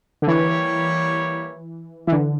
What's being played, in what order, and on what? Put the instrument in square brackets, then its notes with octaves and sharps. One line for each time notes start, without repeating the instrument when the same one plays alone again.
[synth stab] D3
[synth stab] E3 [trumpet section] G3 A#3 E4 G4 C#5
[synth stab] E3
D3